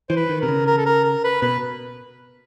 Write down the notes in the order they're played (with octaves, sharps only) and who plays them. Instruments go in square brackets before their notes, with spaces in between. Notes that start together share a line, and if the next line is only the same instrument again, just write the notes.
[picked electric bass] E3 [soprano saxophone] C5
[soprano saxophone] B4
[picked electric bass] D#3
[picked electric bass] C3 [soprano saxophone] A#4
[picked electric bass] C#3
[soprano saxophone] A#4
A4
A#4
A#4
B4
[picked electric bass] B2 [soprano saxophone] B4